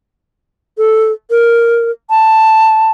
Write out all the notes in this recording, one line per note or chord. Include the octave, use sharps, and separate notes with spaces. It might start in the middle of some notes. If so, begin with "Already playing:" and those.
A4
A#4
A5